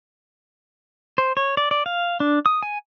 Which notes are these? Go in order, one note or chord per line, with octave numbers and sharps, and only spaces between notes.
C5
C#5
D5
D5
F5
D4
D#6
G#5